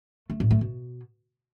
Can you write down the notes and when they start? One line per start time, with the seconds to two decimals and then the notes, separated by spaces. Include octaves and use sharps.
0.30 A3
0.40 A2
0.51 A3
0.61 B2